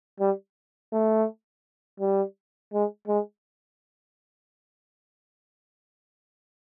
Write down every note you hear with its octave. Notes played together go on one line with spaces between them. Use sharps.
G3
A3
G3
G#3
G#3